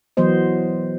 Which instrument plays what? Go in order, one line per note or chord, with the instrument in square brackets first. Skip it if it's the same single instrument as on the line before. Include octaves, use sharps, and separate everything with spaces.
[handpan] E3 F#3 B3 C5 D#5